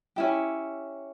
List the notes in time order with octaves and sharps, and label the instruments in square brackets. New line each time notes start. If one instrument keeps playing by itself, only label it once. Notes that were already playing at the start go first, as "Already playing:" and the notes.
[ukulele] C#4 E4 G4